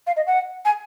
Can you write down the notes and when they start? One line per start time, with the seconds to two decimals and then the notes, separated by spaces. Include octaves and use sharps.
0.07 F5
0.17 D#5
0.27 F#5
0.65 G#5